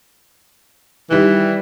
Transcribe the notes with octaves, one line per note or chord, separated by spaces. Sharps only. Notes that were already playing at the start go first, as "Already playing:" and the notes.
D#3 E3 G3